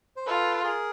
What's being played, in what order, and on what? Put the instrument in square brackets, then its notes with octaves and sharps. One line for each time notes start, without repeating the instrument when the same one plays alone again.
[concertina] C5
[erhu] F4 [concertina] A4 B4
[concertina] G#4 A#4